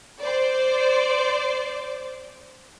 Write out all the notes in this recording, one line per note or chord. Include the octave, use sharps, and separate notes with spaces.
C5 D5